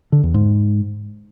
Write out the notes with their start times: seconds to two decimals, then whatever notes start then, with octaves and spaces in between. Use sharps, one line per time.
0.12 D3
0.23 E2
0.34 G#2